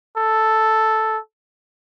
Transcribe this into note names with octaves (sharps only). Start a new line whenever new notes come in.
A4